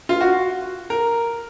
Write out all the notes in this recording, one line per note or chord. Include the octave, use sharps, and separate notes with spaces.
F4
F#4
A#4